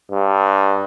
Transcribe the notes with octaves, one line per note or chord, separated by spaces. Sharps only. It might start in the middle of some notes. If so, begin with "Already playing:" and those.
G2